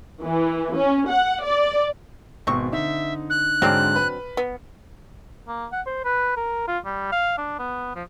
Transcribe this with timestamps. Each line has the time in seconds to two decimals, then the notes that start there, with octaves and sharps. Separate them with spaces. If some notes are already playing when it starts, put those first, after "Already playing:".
0.23 E3
0.76 C#4
1.09 F#5
1.44 D5
2.47 G#1 B2 C4 C6 C#6
2.72 D3 D#4 E5
3.30 F#6
3.62 G#2 D3 F#3 C4 D4 F6
3.96 B4 B5
4.37 B3
5.48 A#3
5.72 F#5
5.86 C5
6.04 B4
6.37 A#4
6.67 F4
6.85 G3
7.11 F5
7.38 D4
7.59 B3
7.95 F3